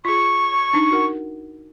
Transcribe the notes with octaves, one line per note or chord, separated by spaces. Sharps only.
F4 G#4 C#6
D4 D#4
F#4 A#4 F#5